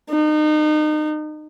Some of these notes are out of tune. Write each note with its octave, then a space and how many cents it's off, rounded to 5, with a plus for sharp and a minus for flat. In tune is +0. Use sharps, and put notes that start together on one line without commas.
D#4 -30